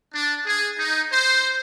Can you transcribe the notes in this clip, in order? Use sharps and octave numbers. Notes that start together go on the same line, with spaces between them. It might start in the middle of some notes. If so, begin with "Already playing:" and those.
D4
G#4
D#4
C5